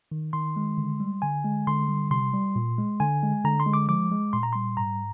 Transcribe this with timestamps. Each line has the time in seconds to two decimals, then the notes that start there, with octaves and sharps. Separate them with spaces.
0.12 D#3
0.33 D#3 C6
0.56 G#3
0.78 D3
1.00 G3
1.22 D3 G#5
1.45 G#3
1.67 D3 C6
1.89 G3
2.11 C3 C6
2.33 G3
2.56 A#2
2.78 G#3
3.00 D3 G#5
3.23 G#3
3.44 D3 A#5
3.60 C6
3.66 G#3
3.73 D6
3.88 F3 D6
4.11 G#3
4.33 A#2 C6
4.43 A#5
4.53 G3 C6
4.77 G#2 A#5